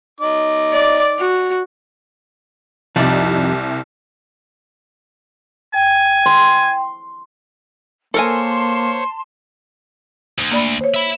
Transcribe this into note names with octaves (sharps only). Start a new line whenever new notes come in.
D#4 D6
D5
F#4
C2 F2 C3 D#4 D5
G5 G#5
C6
A#3 A4 A#4 C5 C#5 G#5 A5 C6
D2
A#3 D5 B5
C5 C#5
E5 B5